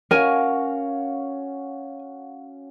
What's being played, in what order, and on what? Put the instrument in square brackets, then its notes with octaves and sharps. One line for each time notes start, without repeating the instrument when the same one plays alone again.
[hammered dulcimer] C#4 F#4 F5 [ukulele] A#4 G#5